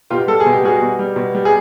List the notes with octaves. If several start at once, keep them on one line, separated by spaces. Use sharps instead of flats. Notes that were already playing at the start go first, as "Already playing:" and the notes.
B2 F4 G4
G3 A4
G#4
B2
G4
G3 F#4 G#4
B2
G3
B2
G3
G#4